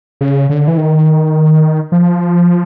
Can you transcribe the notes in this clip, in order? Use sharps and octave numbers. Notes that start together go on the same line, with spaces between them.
C#3
D3
E3
D#3
F3